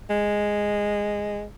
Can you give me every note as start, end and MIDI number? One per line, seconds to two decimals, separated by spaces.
0.10 1.46 56